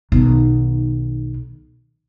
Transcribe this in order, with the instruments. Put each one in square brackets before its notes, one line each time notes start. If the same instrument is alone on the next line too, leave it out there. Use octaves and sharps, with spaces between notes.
[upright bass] B1 D#3